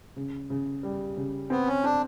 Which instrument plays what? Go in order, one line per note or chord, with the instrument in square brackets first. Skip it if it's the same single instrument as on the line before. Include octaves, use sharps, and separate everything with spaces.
[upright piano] C#3
C#3
G3
C#3
[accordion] B3 [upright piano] C4
[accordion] C#4
[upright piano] C4 [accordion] D4